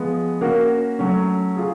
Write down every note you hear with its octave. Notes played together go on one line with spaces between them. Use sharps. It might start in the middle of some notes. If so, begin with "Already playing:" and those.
Already playing: F3 G#3 B3
A#3 C#4 F#4 A#4
F#3 A3 C#4
F4 G#4